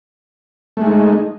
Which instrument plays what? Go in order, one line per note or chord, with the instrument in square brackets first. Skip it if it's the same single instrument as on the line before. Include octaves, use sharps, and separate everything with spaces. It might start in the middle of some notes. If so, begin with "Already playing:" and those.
[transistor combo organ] A3
G#3
D#4